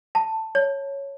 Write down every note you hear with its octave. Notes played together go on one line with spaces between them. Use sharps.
A5
C#5